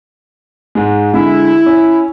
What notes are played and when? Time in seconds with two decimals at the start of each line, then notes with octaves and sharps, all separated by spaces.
0.75 G#2 G#3
1.14 D3 G#3 E4
1.66 C#4